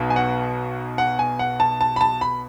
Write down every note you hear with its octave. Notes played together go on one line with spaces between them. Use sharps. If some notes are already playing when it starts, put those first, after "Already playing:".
Already playing: B1 B2
G#5
F#5
F#5
G#5
F#5
A5
A5
B5
A5
B5